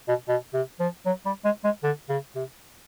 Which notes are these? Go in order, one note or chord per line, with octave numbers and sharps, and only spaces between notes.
B2
B2
C3
F3
F#3
G3
G#3
G#3
D3
C#3
C3